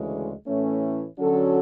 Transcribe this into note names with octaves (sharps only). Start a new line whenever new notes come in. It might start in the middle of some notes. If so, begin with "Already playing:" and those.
Already playing: D2 C#3 E3 G#3
A2 E3 A3 C#4
D3 F#3 C#4 F#4 A4